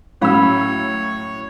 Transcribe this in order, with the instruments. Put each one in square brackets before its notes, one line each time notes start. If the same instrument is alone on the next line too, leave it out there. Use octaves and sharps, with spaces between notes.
[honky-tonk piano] A2 F#3 E6 [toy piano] C#4 F5 B5 [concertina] C#5